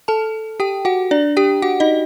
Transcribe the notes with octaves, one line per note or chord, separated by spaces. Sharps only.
A4 A5
G4 G5
F#4 F#5
D4 D5
G4 G5
F#4 F#5
D#4 D#5